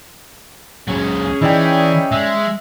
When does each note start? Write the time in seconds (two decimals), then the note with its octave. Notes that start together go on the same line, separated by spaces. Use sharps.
0.88 C#2 F#3 C#4 G#4
1.42 E3 D#4 E4 D5 G5
2.12 G#3 E5